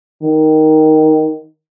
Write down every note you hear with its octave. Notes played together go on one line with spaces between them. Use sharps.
D#3